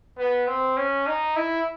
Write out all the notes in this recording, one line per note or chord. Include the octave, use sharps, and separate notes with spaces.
B3
C4
C#4
D#4
E4